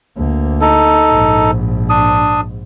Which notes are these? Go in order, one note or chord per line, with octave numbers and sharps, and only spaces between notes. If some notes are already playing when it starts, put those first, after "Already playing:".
D2 A#3
D#4 A4
A#1 G#2
D4 D#6